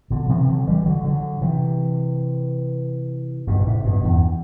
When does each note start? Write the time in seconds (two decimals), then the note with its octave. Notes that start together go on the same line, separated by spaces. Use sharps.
0.10 B2 D3
0.25 F#3
0.29 C3 E3
0.48 D3 F#3
0.67 E3 G3
0.86 D3 F#3
1.04 D3 F#3
1.41 C3 E3
3.47 G2 B2
3.60 B2
3.67 A2 C3
3.85 G2 B2
4.03 E2 G2